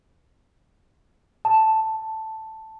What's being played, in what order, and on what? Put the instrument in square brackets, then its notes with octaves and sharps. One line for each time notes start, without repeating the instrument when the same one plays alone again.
[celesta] A5